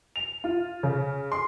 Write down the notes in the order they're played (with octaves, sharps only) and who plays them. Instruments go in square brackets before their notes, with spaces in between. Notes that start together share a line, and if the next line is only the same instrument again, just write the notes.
[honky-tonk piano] F7
F4
C#3
C6